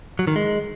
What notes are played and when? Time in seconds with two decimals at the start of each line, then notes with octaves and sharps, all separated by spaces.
0.19 F#3
0.27 D#3
0.36 G#3